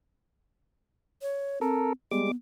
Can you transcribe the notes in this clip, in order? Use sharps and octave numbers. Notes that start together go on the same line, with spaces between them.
C#5
C4 A4 A#4
G3 G#3 B3 D6
B3